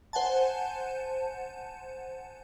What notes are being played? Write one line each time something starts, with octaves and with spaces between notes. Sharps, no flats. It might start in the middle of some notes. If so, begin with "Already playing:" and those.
C5 F#5 G#5 A5